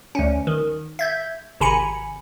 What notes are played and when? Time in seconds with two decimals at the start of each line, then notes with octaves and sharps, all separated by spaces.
0.15 D2 C#4
0.47 D#3
0.99 E5 G6 G#6
1.60 G#1 C3 G#5 A#5 B5 C#7